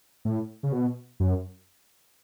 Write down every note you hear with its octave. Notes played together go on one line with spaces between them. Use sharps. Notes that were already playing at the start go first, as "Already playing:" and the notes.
A2
C#3
B2
F#2